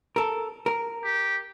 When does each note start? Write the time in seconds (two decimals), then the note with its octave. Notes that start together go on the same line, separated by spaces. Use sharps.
0.16 A4 A#4
0.66 A#4
1.05 G4